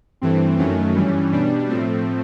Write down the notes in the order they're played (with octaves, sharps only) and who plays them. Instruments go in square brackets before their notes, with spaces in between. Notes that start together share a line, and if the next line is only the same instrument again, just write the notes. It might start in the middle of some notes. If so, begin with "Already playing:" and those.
[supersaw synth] G2 E3 A3 C4
F#2 D#3 F#3 A3 C#4
G2 E3 G3
B2 G3 D4
A2 F3 A3 C4